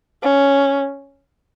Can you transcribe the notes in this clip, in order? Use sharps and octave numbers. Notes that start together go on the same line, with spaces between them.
C#4